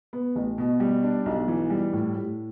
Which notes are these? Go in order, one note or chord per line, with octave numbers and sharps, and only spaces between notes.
B3
A1
B2
G3
D4
B1
E3
G3
A2
A2